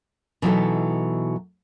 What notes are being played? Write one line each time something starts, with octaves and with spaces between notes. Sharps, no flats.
B2 E3 F#3 D#4 E4 A4